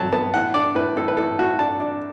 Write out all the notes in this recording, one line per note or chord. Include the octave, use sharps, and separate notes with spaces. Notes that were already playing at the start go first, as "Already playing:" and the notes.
Already playing: F#3 A5
B3 A5
A2 F#5
D4 D5
A2 B4
A2 A4
B4
A2 A4
A2 F#4
D4 A5
D4